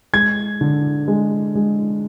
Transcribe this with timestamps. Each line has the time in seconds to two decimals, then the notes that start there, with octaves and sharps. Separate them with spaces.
0.13 G#3 G#6
0.61 D3
1.08 G#3
1.55 G#3